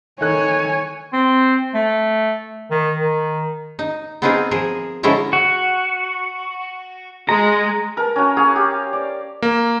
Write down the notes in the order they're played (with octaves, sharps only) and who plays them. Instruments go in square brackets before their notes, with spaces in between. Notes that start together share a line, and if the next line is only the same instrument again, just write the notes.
[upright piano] D#3 A4 F#6 [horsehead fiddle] C#5 G#5
[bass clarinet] C4
A3
D#3
D#3
[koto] D#4
B3 C4 D#4 F4 G#4 A#4
F3 G#4 A#4
D3 F3 G#3 C#4 E4 A#5
[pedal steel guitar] F#4
[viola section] G#3 [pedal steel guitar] A#5
[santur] A#4 A5
C#4 F#4
F#4 G#4 F5
G4
D5
[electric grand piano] A#3